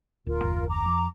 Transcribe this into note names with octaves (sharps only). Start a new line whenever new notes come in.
D1 F4 A#4
F#1 D#2
A#5 D6
F2